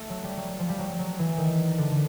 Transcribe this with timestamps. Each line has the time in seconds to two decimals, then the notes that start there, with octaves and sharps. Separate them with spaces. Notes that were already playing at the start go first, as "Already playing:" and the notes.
Already playing: A3
0.10 F#3
0.24 G3
0.37 F#3
0.59 F3
0.69 G3
0.79 F#3
0.89 F#3
0.99 F#3
1.19 E3
1.38 D#3
1.78 D3
1.91 D3